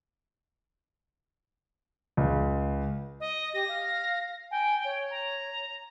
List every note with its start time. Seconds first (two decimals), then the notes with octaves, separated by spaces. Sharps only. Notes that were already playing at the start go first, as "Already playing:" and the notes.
2.17 C#2
3.20 D#5
3.54 G4 A#6
3.68 F5
4.51 G5 G#5
4.84 C#5
5.11 A#5